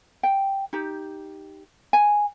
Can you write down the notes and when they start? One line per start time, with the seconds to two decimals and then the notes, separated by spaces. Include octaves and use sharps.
0.23 G5
0.73 D#4 G4
1.93 G#5